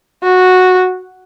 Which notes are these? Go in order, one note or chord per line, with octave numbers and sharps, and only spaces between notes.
F#4